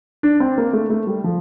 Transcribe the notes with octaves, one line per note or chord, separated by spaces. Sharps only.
D4
C4
A#3
A3
A3
G3
F3